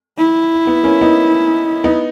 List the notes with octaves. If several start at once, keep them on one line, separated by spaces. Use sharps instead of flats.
E4
B3
A#3 C#4
B3 D#4
B3 D#4